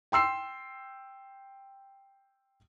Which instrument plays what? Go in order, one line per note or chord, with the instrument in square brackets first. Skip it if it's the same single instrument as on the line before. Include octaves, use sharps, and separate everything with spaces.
[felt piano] G5 C6 E6 C7